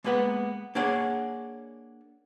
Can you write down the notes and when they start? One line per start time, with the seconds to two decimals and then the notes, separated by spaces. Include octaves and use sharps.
0.04 G#3 A#3 B3 B4 F#5
0.75 A#3 D4 G#4 C#5 F#5